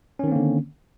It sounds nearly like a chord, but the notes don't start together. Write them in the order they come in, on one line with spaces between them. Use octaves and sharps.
C#4 D#3 C4 A#3 D3